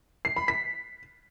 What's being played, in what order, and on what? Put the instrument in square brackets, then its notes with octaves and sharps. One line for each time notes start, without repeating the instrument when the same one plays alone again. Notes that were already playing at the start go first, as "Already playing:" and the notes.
[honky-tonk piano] C7
B5
B6